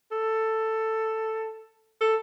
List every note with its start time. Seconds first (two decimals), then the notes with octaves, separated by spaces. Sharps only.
0.12 A4
2.01 A4